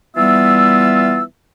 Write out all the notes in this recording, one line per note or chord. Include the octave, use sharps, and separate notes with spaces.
E3 G3 B3 F4 E5 E6